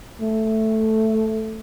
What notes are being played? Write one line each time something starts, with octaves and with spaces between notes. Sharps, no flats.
A3